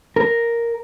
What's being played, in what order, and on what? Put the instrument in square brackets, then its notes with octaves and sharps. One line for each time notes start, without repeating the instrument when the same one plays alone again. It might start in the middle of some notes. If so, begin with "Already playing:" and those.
[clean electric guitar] A#4